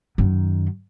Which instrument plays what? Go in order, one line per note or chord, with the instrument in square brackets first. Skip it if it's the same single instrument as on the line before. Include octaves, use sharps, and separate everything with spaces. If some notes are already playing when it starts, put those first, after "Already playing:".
[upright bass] F#2 D#3